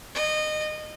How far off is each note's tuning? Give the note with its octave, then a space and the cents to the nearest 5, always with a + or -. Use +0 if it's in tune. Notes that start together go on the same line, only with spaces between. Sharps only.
D#5 -25